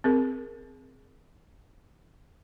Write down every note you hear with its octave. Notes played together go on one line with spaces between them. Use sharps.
C4 G#4 A#4